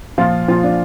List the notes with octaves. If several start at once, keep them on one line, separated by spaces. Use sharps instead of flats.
A#2 F3 F4
A#2 F3 F4
D4